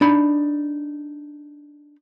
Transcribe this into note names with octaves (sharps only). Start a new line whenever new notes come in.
D4 D#4 B5